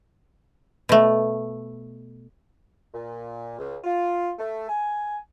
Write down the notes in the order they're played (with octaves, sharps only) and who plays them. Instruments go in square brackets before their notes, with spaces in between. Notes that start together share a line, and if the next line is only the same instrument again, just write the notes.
[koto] B2 A3
[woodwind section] A#2
C#2
F4
A3
G#5